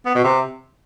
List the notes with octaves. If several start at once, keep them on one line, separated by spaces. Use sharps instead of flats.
B3
B2
C3